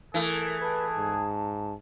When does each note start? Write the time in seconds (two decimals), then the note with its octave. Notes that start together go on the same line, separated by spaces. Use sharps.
0.14 E3 A3 G#4 A#4
0.61 B4 A5
0.97 G#2